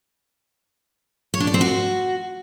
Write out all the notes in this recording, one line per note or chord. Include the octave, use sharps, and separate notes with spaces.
C#5
D4
D5
C4
F#4